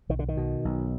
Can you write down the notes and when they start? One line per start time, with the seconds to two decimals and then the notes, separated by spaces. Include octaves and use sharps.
0.09 B1 D#3
0.19 D3
0.28 D#3
0.37 B2
0.65 B1